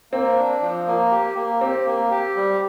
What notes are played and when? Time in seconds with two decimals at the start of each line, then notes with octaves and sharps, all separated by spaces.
0.12 A#3 C4
0.37 D4
0.61 F3
0.87 A#3
1.11 G4
1.36 A#3
1.61 C4 G4
1.86 A#3
2.11 G4
2.37 G3